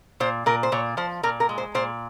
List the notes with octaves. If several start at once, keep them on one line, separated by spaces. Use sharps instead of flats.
A#2 C5
A#2 A#4
C5
A#2 C#5
F3 C5
A#2 A#4
A#4
G#3
C5
A#2 C5